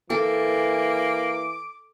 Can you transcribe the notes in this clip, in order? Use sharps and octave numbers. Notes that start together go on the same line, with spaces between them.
E3 A#3 A4 D6